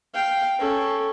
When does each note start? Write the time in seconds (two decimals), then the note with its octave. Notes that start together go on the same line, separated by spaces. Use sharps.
0.14 F5 G5
0.59 C#4 A4